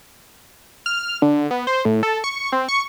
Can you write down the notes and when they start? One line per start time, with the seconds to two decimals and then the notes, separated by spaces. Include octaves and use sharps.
0.86 F6
1.22 D3
1.51 B3
1.67 C5
1.85 A2
2.03 A4
2.24 C#6
2.52 C4
2.68 C#6